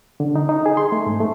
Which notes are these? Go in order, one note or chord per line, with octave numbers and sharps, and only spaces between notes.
D3
D#4
D#4
G#4
C6
A3
G#2
A3